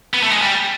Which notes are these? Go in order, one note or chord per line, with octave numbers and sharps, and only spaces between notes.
B3
A3
G#3
G3